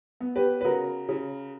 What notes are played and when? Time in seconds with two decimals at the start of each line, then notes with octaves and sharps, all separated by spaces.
0.20 B3
0.35 G4 B4
0.61 B4
0.64 C#3 F#4 A#4
1.08 C#3